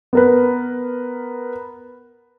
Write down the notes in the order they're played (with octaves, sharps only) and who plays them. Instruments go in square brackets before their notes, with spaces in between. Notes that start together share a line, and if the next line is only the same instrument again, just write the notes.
[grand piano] B3 A#4 B4